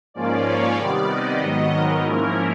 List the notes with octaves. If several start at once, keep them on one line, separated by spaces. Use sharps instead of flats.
G#2 F3 A#3 C#4 F4 D5
C#5
C3 D#3 G3 B3 D5
D#5
G#2 D#3 F#3 B3
A#4
G#2 F3 A#3 C#4 E4